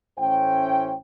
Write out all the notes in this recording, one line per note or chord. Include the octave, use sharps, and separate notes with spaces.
A1 A3 C#4 E4 C5 G5